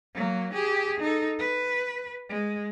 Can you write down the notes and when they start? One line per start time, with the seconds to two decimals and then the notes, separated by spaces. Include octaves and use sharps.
0.14 F#3 A#3
0.53 G4 G#4
1.00 D#4 A4
1.39 B4
2.29 G#3